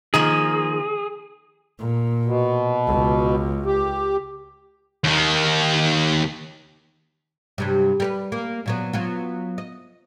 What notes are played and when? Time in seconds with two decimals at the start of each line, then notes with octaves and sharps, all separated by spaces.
0.14 D#3 F3 A#3 G#4
1.79 A#2
2.25 B2
2.87 C#2
3.66 G4
5.04 D#2 D#3
7.58 G2 C3 F#3
8.00 G3 A#4 B4
8.32 A#3
8.66 A#2 F#3 B3
8.93 F#3 B3 F4
9.58 D#5